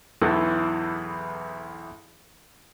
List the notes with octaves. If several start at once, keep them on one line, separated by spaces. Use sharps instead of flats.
B1 E2 E3 B3 E4 A4